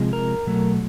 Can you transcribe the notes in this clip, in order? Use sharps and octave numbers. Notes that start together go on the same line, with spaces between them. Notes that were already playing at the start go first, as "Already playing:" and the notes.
Already playing: C3 F3 G#3
A#4
B2 F#3 A3